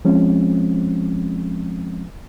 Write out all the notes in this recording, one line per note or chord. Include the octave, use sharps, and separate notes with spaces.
F3 G#3 C4 C#4